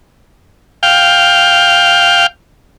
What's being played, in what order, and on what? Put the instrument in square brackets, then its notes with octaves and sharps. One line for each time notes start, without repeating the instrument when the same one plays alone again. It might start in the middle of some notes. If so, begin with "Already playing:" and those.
[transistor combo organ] F5 G5